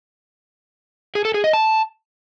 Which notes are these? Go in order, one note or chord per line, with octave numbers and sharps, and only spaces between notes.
G#4
A4
G#4
D#5
A5